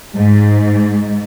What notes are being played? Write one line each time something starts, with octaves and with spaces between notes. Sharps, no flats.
G#2